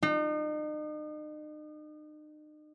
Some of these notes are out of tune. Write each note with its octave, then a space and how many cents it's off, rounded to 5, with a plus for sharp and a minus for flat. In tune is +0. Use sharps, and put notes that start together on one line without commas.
D#4 -40